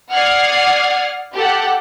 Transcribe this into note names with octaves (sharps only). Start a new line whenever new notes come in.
D5 F#5 D#6 F6 G#6 C7
G4 A4 F#5